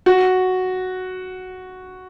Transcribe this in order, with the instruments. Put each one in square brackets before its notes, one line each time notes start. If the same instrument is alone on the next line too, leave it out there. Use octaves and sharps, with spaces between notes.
[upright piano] F#4